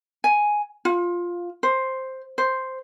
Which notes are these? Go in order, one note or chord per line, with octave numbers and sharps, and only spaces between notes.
G#5
F4
C5
C5